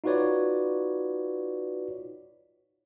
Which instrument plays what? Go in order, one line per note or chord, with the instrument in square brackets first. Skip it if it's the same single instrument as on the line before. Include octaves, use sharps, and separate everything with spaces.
[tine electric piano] D#4 F4 F#4 B4 C#5 D5